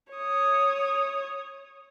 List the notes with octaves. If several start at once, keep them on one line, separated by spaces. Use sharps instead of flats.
C#5 D#6